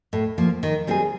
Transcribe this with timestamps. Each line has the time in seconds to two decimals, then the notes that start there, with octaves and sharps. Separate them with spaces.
0.13 A2
0.38 F3 A#3
0.63 D#3
0.87 G3 C4 E4 G#4